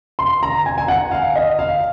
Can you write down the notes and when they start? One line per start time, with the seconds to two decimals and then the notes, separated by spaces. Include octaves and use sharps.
0.19 C6
0.43 A#5
0.66 G#5
0.78 G#5
0.88 F#5
1.12 F5
1.36 D#5
1.59 F5